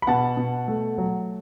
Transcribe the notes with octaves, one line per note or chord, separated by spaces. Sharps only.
B5
B2 F#5 A5
B2
A3
F#3